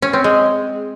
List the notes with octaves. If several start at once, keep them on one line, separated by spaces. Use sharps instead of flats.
C#4
C4
G#3